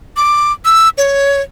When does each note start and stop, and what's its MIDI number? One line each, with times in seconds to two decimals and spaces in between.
0.17 0.52 86
0.65 0.89 88
0.98 1.41 73